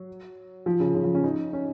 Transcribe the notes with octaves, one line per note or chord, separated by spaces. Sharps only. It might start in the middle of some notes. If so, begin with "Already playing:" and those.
Already playing: F#3
F3
C#3
C#3
F3
C#4
D#4
C#4